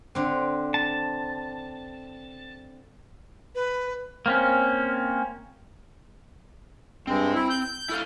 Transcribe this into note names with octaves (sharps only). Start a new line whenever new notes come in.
D3 C4
A5
B4
A#3 C4 C#4
G2 G#3 C4
E4
G6
E4 A4 F5